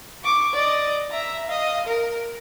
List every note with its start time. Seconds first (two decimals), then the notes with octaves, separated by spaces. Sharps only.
0.23 C#6 D6
0.53 D5 D#5
1.11 E5 A#5
1.46 D#5 F5
1.87 A#4